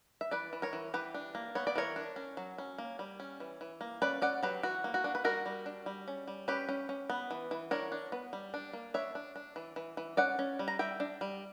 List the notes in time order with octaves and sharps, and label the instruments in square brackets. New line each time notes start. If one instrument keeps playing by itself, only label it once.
[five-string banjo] E5
E3 B4 D5
E3
A#4 C#5
E3
E3 G4 B4
D4
A#3
B3 C#5
D5
E3 A#4 C#5
D4
C#4
F#3
C#4
A#3
G3
C#4
E3
E3
A#3
C#4 B4 D5
C#4 D5 F#5
F#3 G4 B4
E3 F#4
A#3
F#4
D4
B4
G3 F#4 A#4
G3
D4
G3
C#4
G3
C#4 G4 B4
C#4
C#4
B3
E3
E3
D4 A#4 C#5
D4
B3
G3
D4
A#3
D4 C#5 E5
D4
D4
E3
E3
E3
C#4 D5 F#5
C#4
G3
A#5
G3 E5 G5
D4
G3